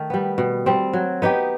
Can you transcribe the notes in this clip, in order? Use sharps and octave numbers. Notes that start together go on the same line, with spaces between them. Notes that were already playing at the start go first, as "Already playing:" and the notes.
Already playing: D#3 A3
G3 B3
B2
G3 C4
F#3
B3 D#4 G4